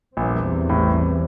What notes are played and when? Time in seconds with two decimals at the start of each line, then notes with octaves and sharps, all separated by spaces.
0.16 A#1 E2 A#2 E3 G3 C4
0.69 A1 A2